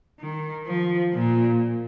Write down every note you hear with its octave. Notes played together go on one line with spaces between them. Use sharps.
D#3
F3
A#2